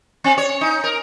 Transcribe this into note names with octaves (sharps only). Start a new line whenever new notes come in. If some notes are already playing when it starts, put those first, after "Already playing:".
C4
C#5
D#4
A#4